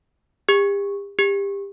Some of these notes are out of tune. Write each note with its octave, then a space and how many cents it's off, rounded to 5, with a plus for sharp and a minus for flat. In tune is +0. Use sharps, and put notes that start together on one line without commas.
G4 +40
G4 +25